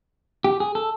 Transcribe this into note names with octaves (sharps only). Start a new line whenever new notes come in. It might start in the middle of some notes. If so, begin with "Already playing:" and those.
G4
G#4
A4